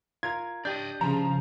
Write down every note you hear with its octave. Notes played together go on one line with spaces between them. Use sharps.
F4 A#4 G#6
D4 G4 D5 D#5 G6
C#3 F3 A#5